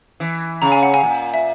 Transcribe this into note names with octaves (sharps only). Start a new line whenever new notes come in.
E3
C#3 A#5
G#5
F#5
G#5
A#2
E5